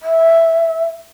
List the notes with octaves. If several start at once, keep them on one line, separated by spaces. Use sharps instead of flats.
E5